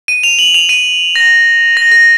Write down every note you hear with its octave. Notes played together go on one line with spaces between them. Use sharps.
D#7
F7
F#7
F7
D#7
A#6
A#6
A#6